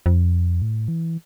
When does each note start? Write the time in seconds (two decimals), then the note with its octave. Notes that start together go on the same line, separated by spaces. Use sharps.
0.06 F2
0.62 A2
0.88 E3